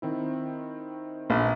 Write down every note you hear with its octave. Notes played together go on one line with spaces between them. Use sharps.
D#3 C4 E4
A#1